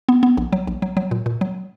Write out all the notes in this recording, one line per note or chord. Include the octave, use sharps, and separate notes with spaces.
B3
B3
A#1
F#3
A#1
F#3
F#3
A#2
A#2
F#3